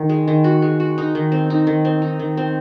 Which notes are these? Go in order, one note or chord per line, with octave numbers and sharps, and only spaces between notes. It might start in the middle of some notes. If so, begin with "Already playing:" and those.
Already playing: D#3
G#3
D#3
F#4
G#3
F#4
D#4
D#3
C4
D#4
D#3
C4
D#4
D#3
C4